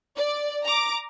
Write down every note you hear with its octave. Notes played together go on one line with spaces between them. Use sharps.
D5
A#5 D6